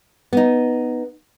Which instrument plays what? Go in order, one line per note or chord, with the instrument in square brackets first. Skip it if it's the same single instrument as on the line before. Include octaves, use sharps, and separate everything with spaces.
[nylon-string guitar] B3 D#4